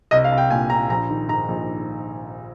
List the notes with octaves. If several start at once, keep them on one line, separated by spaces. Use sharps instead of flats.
C2 D#5
F5
C2
G5
A#2 G#5
A#2 A#5
A#1 A#5
D#3
G#2 A#5
A#1